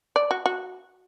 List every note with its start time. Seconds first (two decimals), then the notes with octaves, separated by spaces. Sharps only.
0.16 D5
0.31 F#4
0.46 F#4